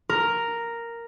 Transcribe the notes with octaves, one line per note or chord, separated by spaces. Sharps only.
A#4